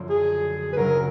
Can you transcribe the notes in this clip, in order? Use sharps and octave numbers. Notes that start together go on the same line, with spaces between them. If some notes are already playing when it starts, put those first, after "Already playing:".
Already playing: F#2 D3 F3 A3
G#4
B4
D2 C#3 F#3 A#4